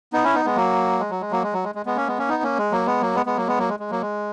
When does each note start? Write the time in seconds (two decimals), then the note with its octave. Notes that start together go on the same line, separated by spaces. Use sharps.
0.13 B3 D#4
0.24 C#4 E4
0.35 B3 D#4
0.45 G#3 B3
0.56 F#3 A#3
1.00 G#3
1.10 F#3
1.21 G#3
1.31 F#3 A#3
1.43 G#3
1.53 F#3
1.64 G#3
1.75 G#3
1.86 G#3 B3
1.96 A#3 C#4
2.07 G#3 B3
2.18 A#3 C#4
2.28 B3 D#4
2.43 A#3 C#4
2.58 G#3
2.72 F#3 A#3
2.86 G#3 B3
3.01 F#3 A#3
3.15 G#3 B3
3.26 G#3 B3
3.37 F#3 A#3
3.47 G#3 B3
3.58 F#3 A#3
3.69 G#3
3.80 G#3
3.91 F#3 A#3
4.01 G#3